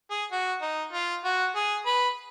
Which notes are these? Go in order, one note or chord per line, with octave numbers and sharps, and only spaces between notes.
G#4
F#4
D#4
F4
F#4
G#4
B4